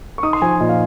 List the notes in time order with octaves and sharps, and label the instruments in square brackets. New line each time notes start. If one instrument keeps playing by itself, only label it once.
[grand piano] C#6
[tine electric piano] D#4 [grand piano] D#6
[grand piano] C6
[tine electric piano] F3 [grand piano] G#5
[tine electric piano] A#2 [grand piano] D#5
[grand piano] F5